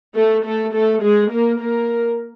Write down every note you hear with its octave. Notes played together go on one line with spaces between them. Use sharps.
A3 A4
A3 A4
A3 A4
G#3 G#4
A#3 A#4
A#3 A#4